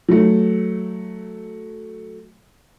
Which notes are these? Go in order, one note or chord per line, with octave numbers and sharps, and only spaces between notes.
F#3 A3